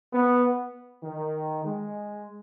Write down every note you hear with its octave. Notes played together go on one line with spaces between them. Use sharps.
B3
D#3
G#3